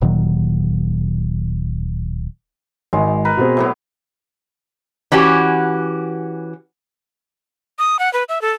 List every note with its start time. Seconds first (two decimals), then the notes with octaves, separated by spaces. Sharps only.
0.01 D1 A#2 D#3 F#3
2.93 G#1 G#3
3.25 A#4 B4
3.37 B2 C4 G#4
3.57 A2 F#3 B3
5.12 E3 C#4 F#4 G4
7.79 D#6
7.99 F#5
8.13 B4
8.29 E5
8.42 A4